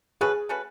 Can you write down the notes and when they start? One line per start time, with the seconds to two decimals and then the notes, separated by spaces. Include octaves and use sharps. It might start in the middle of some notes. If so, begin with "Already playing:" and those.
0.21 A3 C#4 F#4 G#4 B4
0.49 A3 C#4 F#4 B4